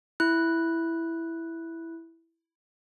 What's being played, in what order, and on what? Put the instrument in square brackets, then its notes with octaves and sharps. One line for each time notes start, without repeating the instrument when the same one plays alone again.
[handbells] E4 F#6